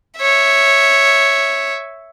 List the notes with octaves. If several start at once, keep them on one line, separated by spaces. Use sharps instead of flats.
C#5 E5